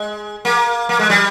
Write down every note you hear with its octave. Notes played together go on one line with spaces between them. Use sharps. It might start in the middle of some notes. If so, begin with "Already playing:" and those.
Already playing: G#3
A#3
A#3
G#3
G3